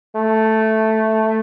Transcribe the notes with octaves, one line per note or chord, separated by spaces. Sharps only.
A3